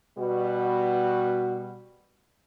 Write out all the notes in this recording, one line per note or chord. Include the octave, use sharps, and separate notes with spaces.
B2 G3 F#4